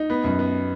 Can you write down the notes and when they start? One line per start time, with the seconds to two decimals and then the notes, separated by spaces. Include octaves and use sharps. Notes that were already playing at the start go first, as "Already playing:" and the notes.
Already playing: D#4
0.10 B3
0.24 F#2
0.39 B3